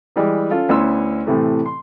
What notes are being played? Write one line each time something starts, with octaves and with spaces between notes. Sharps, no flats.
E3 G3 G#3
C#4 F4 A4
D2 B3 C#4 E4 C6 E6
A2 C3 E3 A3
C6